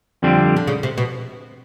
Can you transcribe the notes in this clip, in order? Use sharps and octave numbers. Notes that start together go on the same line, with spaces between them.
F2 D3 G3 C4
D3
C#3
C3
B2